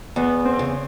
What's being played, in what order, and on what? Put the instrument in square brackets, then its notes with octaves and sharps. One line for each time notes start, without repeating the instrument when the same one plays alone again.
[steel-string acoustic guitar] E2 [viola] B3
[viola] C4
[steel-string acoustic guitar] C#3